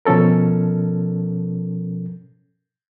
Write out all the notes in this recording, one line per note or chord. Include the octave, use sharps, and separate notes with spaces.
B2 F3 C#4 A4 A#4